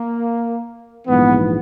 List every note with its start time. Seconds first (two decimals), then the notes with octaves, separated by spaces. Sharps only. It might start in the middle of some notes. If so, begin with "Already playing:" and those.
Already playing: A#3
1.07 A#1 G#2 E3 B3